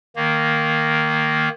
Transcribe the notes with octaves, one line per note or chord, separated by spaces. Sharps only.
D#3 A#3